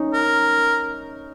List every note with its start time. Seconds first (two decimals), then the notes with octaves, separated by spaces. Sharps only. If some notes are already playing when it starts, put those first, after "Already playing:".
Already playing: C#4 D#4
0.14 A#4